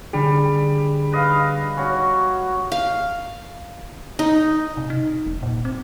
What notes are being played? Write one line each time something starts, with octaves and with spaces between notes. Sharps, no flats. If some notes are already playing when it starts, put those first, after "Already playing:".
D3 G3 D4 G#4
B4 D#5 F5
C#4 F#4
F5
D#4
C3
D#4
E1
A#2
C4